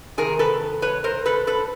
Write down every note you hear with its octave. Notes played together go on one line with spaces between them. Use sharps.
C3 D#3 G#4 A#4
A4 B4
B4 C#5
A#4 C5
A4 B4
A4 B4